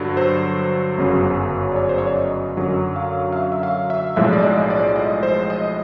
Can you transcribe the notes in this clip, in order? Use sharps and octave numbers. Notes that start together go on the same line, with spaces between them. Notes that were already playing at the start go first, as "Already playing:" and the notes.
Already playing: G2 D3 F#3
C5
G1 F#2 C#3 F#3
D5
C#5
C5
C#5
D5
D#5
F#2 D3 F#3
F5
F5
E5
E5
F5
E5
B1 A2 F3 G#3 E5
D5
D#5
D5
D#5
C5
D#5